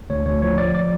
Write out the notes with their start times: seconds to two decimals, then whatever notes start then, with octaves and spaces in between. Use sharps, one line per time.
0.10 D2 C#5
0.26 D2 C#5
0.42 F3 C#5
0.58 F3 D5
0.75 D5